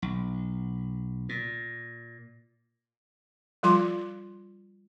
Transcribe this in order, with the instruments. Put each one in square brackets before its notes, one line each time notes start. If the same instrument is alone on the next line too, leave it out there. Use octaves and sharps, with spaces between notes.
[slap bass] B1
A#2
[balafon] F3 G3 F4 C6 D6